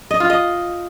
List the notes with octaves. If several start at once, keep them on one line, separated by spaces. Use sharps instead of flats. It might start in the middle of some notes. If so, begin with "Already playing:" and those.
D#5
F4
D#5